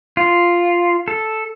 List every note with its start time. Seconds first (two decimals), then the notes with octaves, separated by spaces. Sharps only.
0.17 F4
1.08 A4